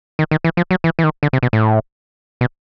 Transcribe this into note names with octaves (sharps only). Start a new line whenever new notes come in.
D#3
D#3
E3
F3
F#3
E3
E3
D#3
D3
C3
B2
A2
B2